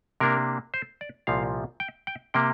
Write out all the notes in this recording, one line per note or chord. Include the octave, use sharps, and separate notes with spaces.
C3 A#3 D4 A#4
C5
D5
C2 A#2 F3 F5
G5
G5
C3 A#3 G5